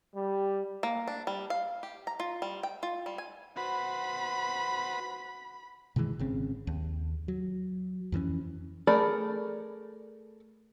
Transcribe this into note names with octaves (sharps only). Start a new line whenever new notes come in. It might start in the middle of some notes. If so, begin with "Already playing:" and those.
G3
A#3
D4
G3
F5
G4
A#5
F4
G3
G5
F4
G3
G#5
F#4 B4 C5 B5
B2 D#3 E3 G#3
G#1 C#3 C4
D#2
F#3
F2 E3 A#3 C#4
A3 G#4 A#4 D5 B5